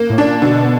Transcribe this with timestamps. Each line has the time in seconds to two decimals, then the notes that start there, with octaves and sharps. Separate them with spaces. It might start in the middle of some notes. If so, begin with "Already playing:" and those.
Already playing: A#3
0.10 A2
0.18 D4
0.26 A#2
0.42 B2 D3